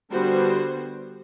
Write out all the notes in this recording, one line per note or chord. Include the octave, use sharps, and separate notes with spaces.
D3 G3 B3 F#4 C5